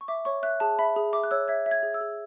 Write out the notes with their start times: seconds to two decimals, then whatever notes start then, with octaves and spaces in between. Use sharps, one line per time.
0.01 C#6
0.08 E5 D6
0.25 C#5 C#6
0.43 E5 F#6
0.60 G#4 A5
0.79 E5 B5
0.96 G#4
1.13 E5 D6
1.23 F#6
1.31 C#5 E6
1.48 E5 G#6
1.66 E5
1.71 G#6
1.83 G#4
1.94 E6
2.01 G#4